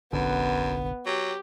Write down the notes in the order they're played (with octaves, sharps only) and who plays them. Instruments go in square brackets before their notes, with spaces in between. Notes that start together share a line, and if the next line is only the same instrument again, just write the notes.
[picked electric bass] F1 A#1 D3 [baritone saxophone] F#2 [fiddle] B3
[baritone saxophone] F#3 [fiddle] G4